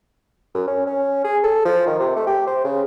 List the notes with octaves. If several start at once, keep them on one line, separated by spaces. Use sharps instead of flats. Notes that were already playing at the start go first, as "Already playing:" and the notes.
F#2
C#4
C#4
G#4
A4
F3
D#3
C3
A3
G4
C5
C#3